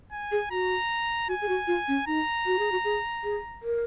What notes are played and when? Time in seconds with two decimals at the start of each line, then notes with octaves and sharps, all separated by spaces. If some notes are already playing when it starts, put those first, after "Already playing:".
0.12 G#5
0.32 G#4
0.50 F#4 A#5
1.28 F#4 G#5
1.41 G#4
1.49 F#4
1.67 F4
1.88 C#4
2.07 D#4 A#5
2.46 F#4
2.59 G#4
2.72 F#4
2.85 G#4
3.24 G#4
3.62 A#4